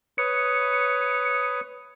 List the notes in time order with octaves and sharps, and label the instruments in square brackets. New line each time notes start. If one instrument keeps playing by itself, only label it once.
[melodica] B4 C#5 D#6 [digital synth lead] C#7